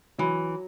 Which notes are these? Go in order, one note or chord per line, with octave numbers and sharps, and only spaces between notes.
E3 F#3